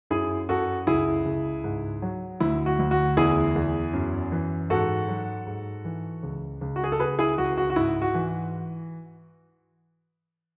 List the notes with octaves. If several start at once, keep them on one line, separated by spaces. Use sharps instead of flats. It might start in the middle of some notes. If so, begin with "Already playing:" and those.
F#2 E4 G#4
F#2 F#4 A4
C#2 E4 G#4
C#2
G#2
F#3
D2 E4
F#4
D2
F#4
E2 E4 G#4
E2
F#2
E3
G#2 F#4 A4
F#3
G#2
E3
C#2
C#2
F#4
G#4
A4
C#2 G#4 B4
E4 G#4
C#2 F#4
F#4
F#4
G#2 E4
F#4
E3